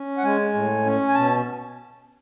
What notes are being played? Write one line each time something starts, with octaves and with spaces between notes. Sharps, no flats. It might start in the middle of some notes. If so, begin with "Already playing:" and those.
Already playing: C#4
F#5
G#3 G#5
A2
C#4
G#5
B2 A5